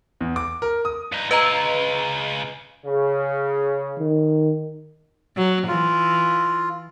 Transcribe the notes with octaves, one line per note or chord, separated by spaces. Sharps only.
E2
D6
A#4
D#6
G2 D#4
C#3 F4 B4 D#5 A#5
C#3
D#3
F#3
E3 F4